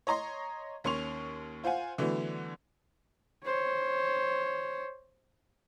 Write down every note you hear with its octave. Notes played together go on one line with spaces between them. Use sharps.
C#5 D#5 A#5 C6
D#2 C#4 C6 C#6 F7
F4 C5 F5 F#5 G#5
D3 E3 F#3 A3 B3
C5 C#5